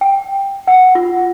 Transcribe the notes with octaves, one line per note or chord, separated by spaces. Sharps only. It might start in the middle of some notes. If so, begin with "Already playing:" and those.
G5
F#5
F4